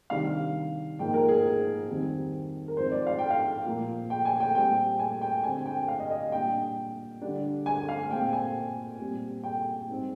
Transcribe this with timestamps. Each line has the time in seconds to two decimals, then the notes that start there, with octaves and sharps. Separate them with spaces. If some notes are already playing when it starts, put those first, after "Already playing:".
0.10 C3 D#3 G3 D4 F5
0.99 G#2 F3 A#3 G5
1.14 A#4
1.28 G#4
1.88 F2 D#3 G3 C4
2.68 A#4
2.77 G#2 F3 C4 C5
2.92 D5
3.07 F5
3.19 G5
3.31 F5
3.66 A#2 F3 A#3
4.10 G5
4.25 G#5
4.40 G5
4.55 A#2 G3 C4 G5
4.99 G#5
5.21 G5
5.43 D3 G#3 C4 G#5
5.66 G5
5.88 F5
5.99 D#5
6.10 D#5
6.32 A#2 G3 D4 G5
7.22 D3 G3 D4
7.66 G#5
7.89 F5
8.10 A#2 G#3 C4 G5
8.33 G#5
8.99 A#2 G3 C4
9.44 G5
9.88 G#2 G3 C4